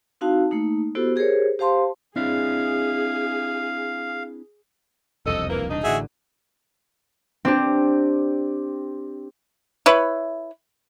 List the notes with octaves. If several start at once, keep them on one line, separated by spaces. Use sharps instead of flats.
C4 D#4 E4 F#4 F5 A5
A3 A#3 D#4
B3 E4 F#4 G4 A4 C5
G4 G#4 A#4 C5 C#5
G4 C5 F5 A5 C6
C4 D4 E4 G#4 F5
E1 C2 F2 A4 D#5
E3 A#3
E1 C2 D4 D#4
A1 A2 D3 F#4 G#4 E5
C4 D4 G4
E4 B4 C#5